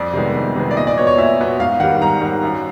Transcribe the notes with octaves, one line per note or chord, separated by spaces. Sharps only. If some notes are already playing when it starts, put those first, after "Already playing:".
Already playing: F2 D5
C3 D#3 G#3 B3
F2
C3 D#3 G#3 B3
D5
A#2 D#5
D5
F#3 B3 C#5
C#5
A#2 E5
F#3 B3
G#2 F5
D#3 G3 F#5
G#2 A#5
D#3 G3
F#2